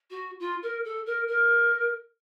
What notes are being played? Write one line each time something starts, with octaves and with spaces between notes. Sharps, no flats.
F#4
F4
A#4
A4
A#4
A#4